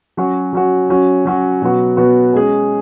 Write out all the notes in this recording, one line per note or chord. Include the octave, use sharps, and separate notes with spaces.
F#3 C#4 F#4
F#3 C#4 F#4
F#3 C#4 F#4
F#3 C#4 F#4
B2 F#3 B3 F#4
B2 F#3 B3 F#4
G#3 C#4 G#4